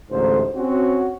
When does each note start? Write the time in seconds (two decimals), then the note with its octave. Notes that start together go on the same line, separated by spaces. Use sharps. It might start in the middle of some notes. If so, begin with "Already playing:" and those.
0.11 A1 D2 G#2 C5
0.55 C4 C#4 F#4